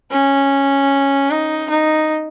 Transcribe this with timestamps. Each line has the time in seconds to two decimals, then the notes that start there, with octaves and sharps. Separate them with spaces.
0.11 C#4
1.31 D#4
1.70 D#4